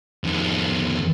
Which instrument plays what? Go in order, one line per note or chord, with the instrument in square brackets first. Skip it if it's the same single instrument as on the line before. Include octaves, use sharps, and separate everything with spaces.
[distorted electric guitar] F2 D#3